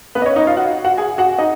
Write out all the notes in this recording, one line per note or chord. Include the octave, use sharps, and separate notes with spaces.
B3 B4
D#5
C#4 C#5
D#4 D#5
F4 F5
F#4 F#5
F#4 F#5
G#4 G#5
F#4 F#5
D#4 D#5